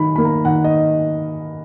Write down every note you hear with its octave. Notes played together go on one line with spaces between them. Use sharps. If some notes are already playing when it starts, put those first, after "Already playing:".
Already playing: D#3 B5
A#3 B5
A#5
D#3 F#5
D#5